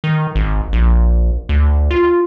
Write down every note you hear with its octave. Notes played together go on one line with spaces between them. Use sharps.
D#3
G#1
A#1
D2
F4